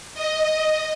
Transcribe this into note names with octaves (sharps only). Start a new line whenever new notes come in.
D#5